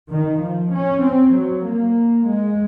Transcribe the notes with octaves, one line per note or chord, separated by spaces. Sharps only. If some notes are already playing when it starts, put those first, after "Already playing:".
D#3
F3
C#4
C4
F#3
A#3
G#3